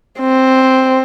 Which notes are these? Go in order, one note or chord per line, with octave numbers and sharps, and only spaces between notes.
C4